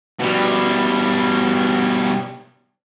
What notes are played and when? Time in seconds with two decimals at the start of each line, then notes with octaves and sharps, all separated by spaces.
0.19 B2 G3